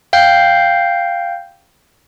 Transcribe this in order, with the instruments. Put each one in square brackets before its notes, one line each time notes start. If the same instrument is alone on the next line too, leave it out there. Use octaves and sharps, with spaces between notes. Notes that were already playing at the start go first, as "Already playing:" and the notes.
[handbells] F5 G5 G6 C7